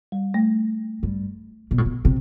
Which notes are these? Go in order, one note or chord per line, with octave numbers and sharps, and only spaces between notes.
G3
A3
G2
B2
A2
B2
C3